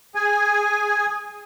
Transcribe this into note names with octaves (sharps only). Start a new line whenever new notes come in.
G#4 G#5